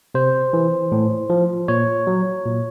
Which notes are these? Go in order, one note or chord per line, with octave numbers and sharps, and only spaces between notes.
C3 C5
E3
A2
F3
A#2 C#5
F#3
A#2